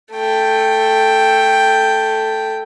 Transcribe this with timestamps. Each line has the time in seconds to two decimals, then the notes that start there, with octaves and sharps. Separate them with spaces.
0.13 A3 G5